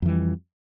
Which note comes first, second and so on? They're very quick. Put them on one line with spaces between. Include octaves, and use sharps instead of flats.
F2 E3 G3